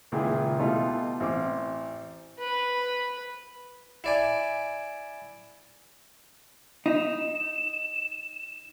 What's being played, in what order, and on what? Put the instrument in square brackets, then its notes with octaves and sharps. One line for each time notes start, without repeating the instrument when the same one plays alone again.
[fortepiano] C#2 A#2 D#3 E4 G#4 E5
B2 E3 G3 A3 D#4 F4
A1 C4 D6
[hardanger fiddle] B4
[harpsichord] E4 D5 G#5
[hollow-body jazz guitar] D#4 [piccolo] E7